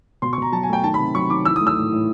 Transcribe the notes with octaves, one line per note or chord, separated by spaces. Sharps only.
B2 C6
C#6
B2 A#5
F#3 A5
G#5
A3 G5
D#3 A5
B5
C3
F#3 C#6
D#3 D6
E3 E6
D#6
A3
E6
A2
A2